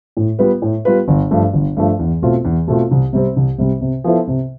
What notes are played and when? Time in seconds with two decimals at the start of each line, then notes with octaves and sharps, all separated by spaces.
0.17 A2
0.39 G3 B3 F4 B4
0.62 A2
0.85 G3 B3 F4 B4
1.08 G1
1.31 G2 F3 A3
1.53 G1
1.77 G2 F3 A3
1.99 E2
2.22 B2 A3 C4 F4
2.45 E2
2.68 B2 A3 C4 F4
2.91 C2
3.13 C3 G3 C4
3.36 C2
3.58 C3 G3 C4
3.81 C3
4.04 F3 B3 E4 A4
4.28 C3